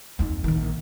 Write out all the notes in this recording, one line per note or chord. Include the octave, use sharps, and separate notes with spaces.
F2 D#4
A#1 D#3